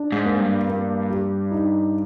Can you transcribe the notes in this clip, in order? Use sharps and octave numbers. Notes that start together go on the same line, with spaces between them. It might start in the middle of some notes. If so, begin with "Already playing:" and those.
Already playing: D4
G#2
A#3
G2
A#3
G3
D#4